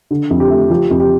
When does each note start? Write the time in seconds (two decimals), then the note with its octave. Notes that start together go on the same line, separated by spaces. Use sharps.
0.11 D3
0.30 F2
0.40 G4
0.50 A3
0.70 F3 G4
0.91 F2
1.00 G4